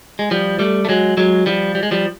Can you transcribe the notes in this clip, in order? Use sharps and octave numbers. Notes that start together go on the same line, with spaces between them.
G#3
F3 G3
G3 A3
A3
F#3 G#3
F#3 G#3
F3 G3
G3
G#3
F3 G3